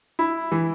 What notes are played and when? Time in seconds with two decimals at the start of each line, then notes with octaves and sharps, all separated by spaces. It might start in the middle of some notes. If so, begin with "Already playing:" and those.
0.19 E4
0.52 E3